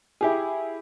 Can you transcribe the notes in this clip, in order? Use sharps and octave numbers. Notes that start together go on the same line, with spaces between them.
E4 G4 G#4